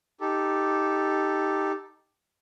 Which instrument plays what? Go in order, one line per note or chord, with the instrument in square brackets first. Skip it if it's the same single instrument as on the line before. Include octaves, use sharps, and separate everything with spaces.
[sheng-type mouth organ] D#4 G4 A4